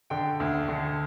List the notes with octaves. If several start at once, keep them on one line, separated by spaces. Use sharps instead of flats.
D3 G5
D2
D3